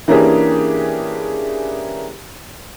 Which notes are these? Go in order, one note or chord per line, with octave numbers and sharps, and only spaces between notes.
E3 A#3 C#4 D4 G4 G#4